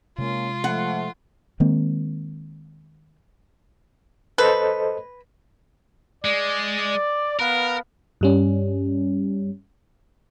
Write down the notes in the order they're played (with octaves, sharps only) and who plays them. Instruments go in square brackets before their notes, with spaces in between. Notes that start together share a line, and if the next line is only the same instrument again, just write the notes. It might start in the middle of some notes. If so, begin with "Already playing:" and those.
[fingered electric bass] C3 G#3 [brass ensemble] A#3 C#4 [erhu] F4
[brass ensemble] F3 A3 [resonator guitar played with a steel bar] F#5
[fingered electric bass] D#3 G#3 A#3 C4
[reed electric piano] A4 C5 D#5 [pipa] B4
[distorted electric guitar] G#3 [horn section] D5
[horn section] B3 B4 F5 [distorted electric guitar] A#4
[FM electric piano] G2 G3 C#4